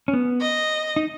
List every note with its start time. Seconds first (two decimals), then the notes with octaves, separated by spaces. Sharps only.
0.08 C#4
0.13 B3
0.41 D#5
0.96 D#4